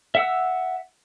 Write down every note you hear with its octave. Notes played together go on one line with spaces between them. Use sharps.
E5 F#5 E6